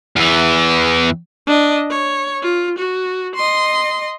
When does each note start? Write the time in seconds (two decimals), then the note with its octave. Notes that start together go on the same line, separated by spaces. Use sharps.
0.16 E2 E3
1.47 D4 D#5
1.90 C#5
2.42 F4
2.79 F#4
3.35 D#5 C6